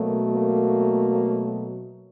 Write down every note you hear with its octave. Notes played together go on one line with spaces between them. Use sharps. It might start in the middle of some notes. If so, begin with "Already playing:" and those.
Already playing: B2 F#3 A3 A#3
A#3